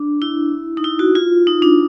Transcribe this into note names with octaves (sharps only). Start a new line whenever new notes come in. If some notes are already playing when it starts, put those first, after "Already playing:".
Already playing: D4
E4
D#4
E4
F#4
F4
D#4
D4